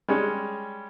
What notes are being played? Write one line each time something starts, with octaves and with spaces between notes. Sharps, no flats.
G3 G#3 C#4